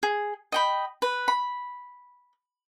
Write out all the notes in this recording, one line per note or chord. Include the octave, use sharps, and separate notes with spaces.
G#4
D#5 G5 B5
B4
B5